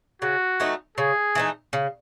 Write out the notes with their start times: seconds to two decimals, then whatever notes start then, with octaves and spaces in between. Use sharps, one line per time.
0.22 C#3 F#4
0.60 E3 A3 D#4
0.98 C#3 G#4
1.35 E3 A3 D#4
1.73 C#3